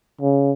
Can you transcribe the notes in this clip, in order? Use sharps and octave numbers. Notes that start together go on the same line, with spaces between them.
C#3